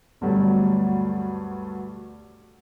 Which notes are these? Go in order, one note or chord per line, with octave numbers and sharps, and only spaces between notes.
D2 G2 B2 F#3 G3 A3